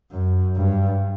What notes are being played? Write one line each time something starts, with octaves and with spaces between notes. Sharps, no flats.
F#2
G2